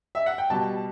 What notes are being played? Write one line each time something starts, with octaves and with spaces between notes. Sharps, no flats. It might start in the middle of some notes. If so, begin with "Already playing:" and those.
E5
F#5
G5
B2 G3 A5